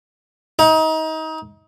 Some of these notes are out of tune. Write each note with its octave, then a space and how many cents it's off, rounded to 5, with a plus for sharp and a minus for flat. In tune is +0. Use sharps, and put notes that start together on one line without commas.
D#4 +30